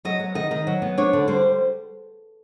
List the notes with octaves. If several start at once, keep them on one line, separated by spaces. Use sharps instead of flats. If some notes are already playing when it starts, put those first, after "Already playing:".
F#3 D#5
B3
D#3 D#5
D#3 D#5
F#3
B3
D4 C#5
D3
G3 C5